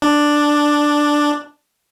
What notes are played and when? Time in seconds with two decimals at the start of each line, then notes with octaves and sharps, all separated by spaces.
0.02 D4